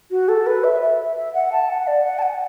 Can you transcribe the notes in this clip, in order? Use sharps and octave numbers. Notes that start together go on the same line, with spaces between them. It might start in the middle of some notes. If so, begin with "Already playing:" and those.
F#4
A4
B4
E5
E5
E5
F#5
A5
F#5
D5
F#5
A5
F#5